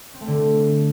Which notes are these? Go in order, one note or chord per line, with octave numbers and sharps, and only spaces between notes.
C4
A3
D3